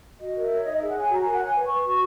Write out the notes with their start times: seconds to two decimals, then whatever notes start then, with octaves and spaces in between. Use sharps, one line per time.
0.20 F#4 D#5
0.35 A#4
0.43 E5
0.51 C#5
0.64 D#4 D#5
0.77 G#4 E5
0.87 F#5
0.96 C#5 G#5
1.09 F#4 A#5
1.21 A#4 G#5
1.32 F#5
1.40 C#5 G#5
1.55 B4
1.67 B4 C#6
1.85 F#4 C#6